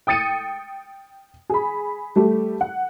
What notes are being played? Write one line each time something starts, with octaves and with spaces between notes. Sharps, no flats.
G5 D#6 A6 C#7 D#7
G#4 B5
G3 A3 G4
F#5